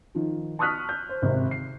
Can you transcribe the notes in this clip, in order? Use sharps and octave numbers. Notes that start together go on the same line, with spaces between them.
D#3 F3
A5 C#6 D#6 F6 F#6 B6
G6
C5
G#1 C3
C7